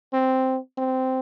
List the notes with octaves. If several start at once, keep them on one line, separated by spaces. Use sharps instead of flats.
C4
C4